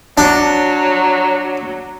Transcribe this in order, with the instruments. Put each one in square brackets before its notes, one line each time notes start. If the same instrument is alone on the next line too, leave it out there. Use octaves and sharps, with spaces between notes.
[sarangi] F#3 [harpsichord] D4